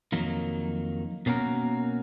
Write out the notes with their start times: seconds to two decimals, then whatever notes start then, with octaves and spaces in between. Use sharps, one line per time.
0.12 F2 D#3 F#3 A#3
1.26 B2 A#3 C#4 F#4 A#4